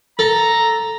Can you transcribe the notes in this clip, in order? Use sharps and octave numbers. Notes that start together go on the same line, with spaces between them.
A4 A#5